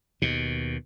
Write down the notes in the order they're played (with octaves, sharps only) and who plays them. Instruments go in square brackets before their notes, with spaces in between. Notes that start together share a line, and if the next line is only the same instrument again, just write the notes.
[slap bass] D#2 B2